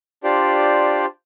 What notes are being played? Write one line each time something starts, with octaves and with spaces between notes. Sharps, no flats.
D4 F4 G4 C5 D5